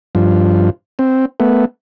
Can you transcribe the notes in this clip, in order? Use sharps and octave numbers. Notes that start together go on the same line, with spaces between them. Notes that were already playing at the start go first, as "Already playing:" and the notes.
G2 F3
C4
A3 B3